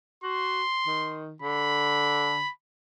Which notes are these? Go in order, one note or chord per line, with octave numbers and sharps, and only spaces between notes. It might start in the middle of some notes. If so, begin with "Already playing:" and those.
F#4 C6
D#3
D3 B5